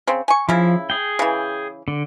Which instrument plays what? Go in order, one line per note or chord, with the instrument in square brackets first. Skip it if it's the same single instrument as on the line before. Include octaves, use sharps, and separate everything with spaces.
[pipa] C#3 C4
G#5 C#6
[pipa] C#3 E4 [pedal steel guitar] F3
[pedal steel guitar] G#4 G5
[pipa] C#3 E3
[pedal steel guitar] D3